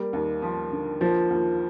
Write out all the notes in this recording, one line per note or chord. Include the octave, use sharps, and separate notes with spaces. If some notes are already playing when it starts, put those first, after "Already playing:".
Already playing: G3 A#3
D#2
F3
D3
F3 A#3
D#2